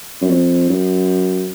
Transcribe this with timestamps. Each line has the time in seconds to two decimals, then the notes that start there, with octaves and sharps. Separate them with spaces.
0.22 F#2
0.30 F2
0.69 F#2